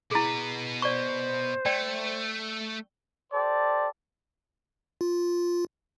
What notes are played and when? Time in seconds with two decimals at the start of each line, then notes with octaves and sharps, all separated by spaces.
0.11 B2 E4 G#4 B4
0.82 C5 D5 C#6
1.66 A3 D5 G5
3.33 G4 A4 C5 D5
5.01 F4